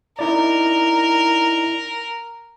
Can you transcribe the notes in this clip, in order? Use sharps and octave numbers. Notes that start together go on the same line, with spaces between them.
D#4 E4 A#4 D5